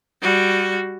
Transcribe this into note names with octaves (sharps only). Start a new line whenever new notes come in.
G3 F#4